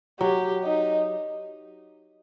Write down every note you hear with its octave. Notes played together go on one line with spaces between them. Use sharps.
F#3 G4
D#4